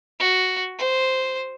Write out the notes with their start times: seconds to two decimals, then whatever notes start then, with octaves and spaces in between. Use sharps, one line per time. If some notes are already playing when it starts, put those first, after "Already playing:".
0.19 F#4
0.78 C5